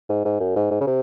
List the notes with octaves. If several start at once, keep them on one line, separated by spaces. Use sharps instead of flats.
G#2
G#2
F#2
G#2
G#2
C#3
C3